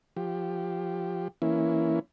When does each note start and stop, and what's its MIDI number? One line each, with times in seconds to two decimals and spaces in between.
0.17 1.28 53
0.17 1.28 67
1.42 1.99 52
1.42 1.99 58
1.42 1.99 61
1.42 1.99 64